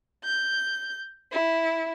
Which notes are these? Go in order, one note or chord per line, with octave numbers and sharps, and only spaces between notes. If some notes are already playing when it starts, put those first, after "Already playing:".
G6
E4